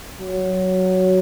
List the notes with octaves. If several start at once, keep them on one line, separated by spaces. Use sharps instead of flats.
F#3